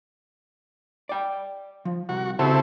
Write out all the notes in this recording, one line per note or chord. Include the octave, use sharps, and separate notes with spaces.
D5 G5
F3
C2 F#4
C#3 C4 E4 F#4 G4 A4